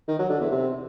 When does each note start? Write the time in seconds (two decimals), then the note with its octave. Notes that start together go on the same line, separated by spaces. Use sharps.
0.08 D#3
0.19 F#3
0.30 D3
0.40 E2
0.51 C3